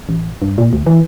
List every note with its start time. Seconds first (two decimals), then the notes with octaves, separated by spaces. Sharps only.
0.09 A1
0.42 G2
0.58 A#2
0.73 D2
0.86 E3